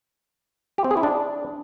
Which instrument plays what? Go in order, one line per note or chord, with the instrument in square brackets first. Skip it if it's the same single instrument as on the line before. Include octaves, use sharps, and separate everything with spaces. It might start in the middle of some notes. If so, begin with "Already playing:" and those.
[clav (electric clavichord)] G4
C4
G#4
E4
D4